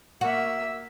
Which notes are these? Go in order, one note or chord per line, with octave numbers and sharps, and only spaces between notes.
A#3 F#4 E5